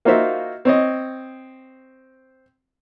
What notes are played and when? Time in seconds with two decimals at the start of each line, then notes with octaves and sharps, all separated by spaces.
0.05 A#3 D#4 F4 F#4 C5 E5
0.65 C4 C#5 D#5